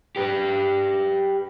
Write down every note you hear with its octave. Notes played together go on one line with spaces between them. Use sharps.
G4 B4